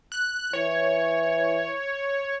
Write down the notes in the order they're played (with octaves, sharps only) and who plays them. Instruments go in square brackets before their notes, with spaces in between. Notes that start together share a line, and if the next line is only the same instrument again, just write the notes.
[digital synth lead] F#6
[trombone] E3 [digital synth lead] C#5